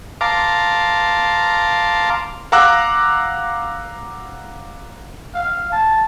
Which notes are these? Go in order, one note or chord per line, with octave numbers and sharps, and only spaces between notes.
F5 A5 A#5 C6 D6
F5 F#5 A#5 D6 E6 F#6
F5
A5